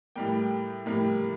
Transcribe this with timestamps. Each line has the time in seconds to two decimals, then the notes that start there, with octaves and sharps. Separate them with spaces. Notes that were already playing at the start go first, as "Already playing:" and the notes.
0.16 A2 G3 A#3 G5
0.86 A2 G3 A#3